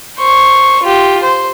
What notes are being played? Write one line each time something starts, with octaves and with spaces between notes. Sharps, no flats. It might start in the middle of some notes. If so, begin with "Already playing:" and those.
C5 C#6
F4 G4
C5